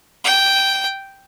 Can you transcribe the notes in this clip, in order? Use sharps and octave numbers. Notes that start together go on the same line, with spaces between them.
G5